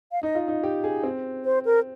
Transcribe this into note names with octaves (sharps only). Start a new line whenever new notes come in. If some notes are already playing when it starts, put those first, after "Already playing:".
F5
D#4 D#5
F4
D#4
G4
G#4
C4
C5
A#4